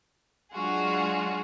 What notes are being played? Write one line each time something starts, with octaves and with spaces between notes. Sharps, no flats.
F#3 G#3 D4 F4 F#4 G#4